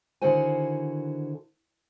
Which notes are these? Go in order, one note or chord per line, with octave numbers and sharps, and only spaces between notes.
D3 D#3 E4 F#4 C5 G#5